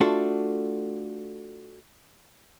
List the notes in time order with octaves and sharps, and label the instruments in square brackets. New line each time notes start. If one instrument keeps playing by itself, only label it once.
[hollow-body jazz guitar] A3 D4 F4 F#4 A4